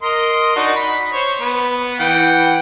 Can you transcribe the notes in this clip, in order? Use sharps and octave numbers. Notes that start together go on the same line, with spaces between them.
A#4 D#5 C6
D4 D#4 F#4
B5
C5 C#5
B3
E3 F#5 G5